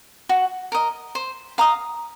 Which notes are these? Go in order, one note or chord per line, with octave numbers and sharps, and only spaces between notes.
F#4
A#4 D#5
C5
F5 A#5 D#6